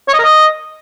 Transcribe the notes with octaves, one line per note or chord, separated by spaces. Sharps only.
C#5
D#5
A#4
D#5